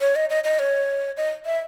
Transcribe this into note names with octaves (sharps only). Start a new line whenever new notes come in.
C#5
D#5
D#5
D#5
C#5
D#5
E5